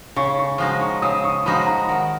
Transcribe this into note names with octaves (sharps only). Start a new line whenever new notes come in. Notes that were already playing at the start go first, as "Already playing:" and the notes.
C#3 C#6
C#6
F3 G#3 D#4 F#4
C#6
C#3 D#6
C#6
F3 G#3 D#4 F#4 B5
A#5
D#3 F#5